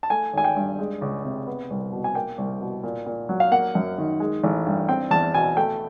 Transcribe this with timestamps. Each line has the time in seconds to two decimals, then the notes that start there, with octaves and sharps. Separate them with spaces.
0.03 A5
0.10 A3 G#5
0.33 G#1 G#5
0.44 G5
0.56 G2
0.79 G#3
1.01 C#2
1.25 C3
1.47 B3
1.70 C2
1.92 B2
2.04 G#5
2.15 A#3 G5
2.38 C2
2.61 B2
2.84 A#2
3.06 A#2
3.29 F#3
3.40 F5
3.52 A#3 F#5
3.75 F#2
3.98 D#3
4.20 G#3
4.44 A1
4.66 G2
4.88 C4 G5
5.11 E2 A5
5.34 B2 G#5
5.57 A3 G5